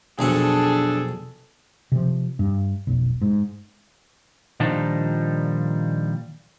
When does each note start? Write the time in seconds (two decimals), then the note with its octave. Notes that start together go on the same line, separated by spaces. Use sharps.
0.19 B1 F2 D4 G#4 A4 F#5
1.92 C3 F3
2.39 G2
2.87 F1 B1
3.22 G#2
4.60 A#2 D#3 F3 G3 D4 D#4